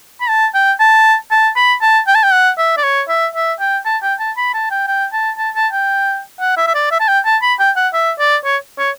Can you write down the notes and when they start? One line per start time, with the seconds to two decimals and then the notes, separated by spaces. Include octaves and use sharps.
0.21 B5
0.29 A5
0.54 G5
0.80 A5
1.31 A5
1.56 B5
1.81 A5
2.07 G5
2.15 A5
2.23 G5
2.32 F#5
2.58 E5
2.77 D5
2.84 C#5
3.09 E5
3.35 E5
3.60 G5
3.85 A5
4.02 G5
4.19 A5
4.37 B5
4.54 A5
4.71 G5
4.87 G5
5.13 A5
5.38 A5
5.55 A5
5.73 G5
6.40 F#5
6.57 E5
6.67 E5
6.75 D5
6.91 E5
7.00 A5
7.08 G5
7.25 A5
7.42 B5
7.59 G5
7.76 F#5
7.93 E5
8.19 D5
8.45 C#5
8.79 C#5